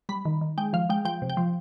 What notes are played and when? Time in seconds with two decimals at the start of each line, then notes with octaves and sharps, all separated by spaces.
0.09 G3 B5
0.25 D#3
0.41 D#3
0.58 G#3 G5
0.73 F3 F5
0.90 G#3 G5
1.05 F3 G5
1.22 C3
1.30 G5
1.37 F3